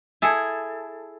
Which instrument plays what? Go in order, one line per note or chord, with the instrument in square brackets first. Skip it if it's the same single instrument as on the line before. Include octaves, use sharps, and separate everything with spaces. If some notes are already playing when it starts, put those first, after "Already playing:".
[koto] E4 G#4 A4